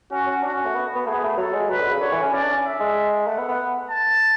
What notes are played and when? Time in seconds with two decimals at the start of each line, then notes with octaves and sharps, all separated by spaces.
0.12 C#4 F#4
0.27 C#4
0.43 D4 F#4
0.54 C#4
0.65 A3
0.74 B3
0.96 B3
1.06 A3 G#4
1.15 B3
1.24 A3
1.38 F#3 A4
1.54 G#3
1.69 F#3 B4
1.80 D3
1.91 C#3
2.01 D3 C#5
2.12 E3
2.23 C#4
2.33 C#4 D5
2.43 D4
2.54 C#4
2.65 E5
2.80 G#3
3.27 A3 F#5
3.38 B3
3.48 B3
3.90 A5